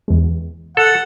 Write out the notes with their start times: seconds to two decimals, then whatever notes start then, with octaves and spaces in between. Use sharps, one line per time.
0.08 E2 G#3
0.77 A4 F#5